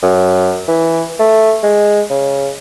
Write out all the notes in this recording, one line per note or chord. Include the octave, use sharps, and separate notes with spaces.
F#2
E3
A3
G#3
C#3